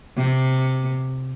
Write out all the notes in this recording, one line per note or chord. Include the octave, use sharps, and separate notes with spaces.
C3